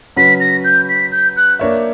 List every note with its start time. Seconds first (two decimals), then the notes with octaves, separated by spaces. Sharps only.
0.16 C#3 F#3 C#4 F#4 B4 B6
0.40 A#6
0.64 G6
0.89 B6
1.12 G6
1.36 F#6
1.59 A#3 D4 A#4 C#5 E5